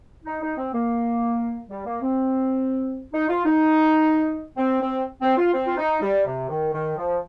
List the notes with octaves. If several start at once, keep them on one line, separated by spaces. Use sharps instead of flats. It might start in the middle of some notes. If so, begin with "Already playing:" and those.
D#4
D#4
C4
A#3
G3
A#3
C4
D#4
F4
D#4
C4
C4
C4
F4
C4
F4
D#4
G3
C3
D#3
D#3
F3